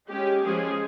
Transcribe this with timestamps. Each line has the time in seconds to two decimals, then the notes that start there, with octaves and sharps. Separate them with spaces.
0.09 G#3 C#4 G4
0.44 F3 G#3 C#4 G#4